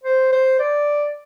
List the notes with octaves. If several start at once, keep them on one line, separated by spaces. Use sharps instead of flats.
C5
C5
D5